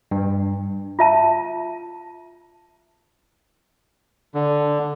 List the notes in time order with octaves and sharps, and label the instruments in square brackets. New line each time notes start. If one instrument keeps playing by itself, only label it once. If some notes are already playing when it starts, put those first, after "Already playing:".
[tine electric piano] G2
[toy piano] F4 E5 A5
[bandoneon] D3